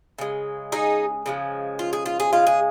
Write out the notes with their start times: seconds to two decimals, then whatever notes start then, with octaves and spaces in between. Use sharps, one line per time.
0.18 C#3 G#3
0.72 D#4 G#4
1.26 C#3 F3 G#3
1.79 F4
1.93 G#4
2.06 F4
2.20 G#4
2.33 C#3 G#3 F4
2.47 G#4